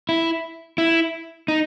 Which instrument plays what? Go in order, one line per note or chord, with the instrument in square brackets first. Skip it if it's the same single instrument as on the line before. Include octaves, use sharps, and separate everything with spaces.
[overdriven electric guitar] E4
E4
D#4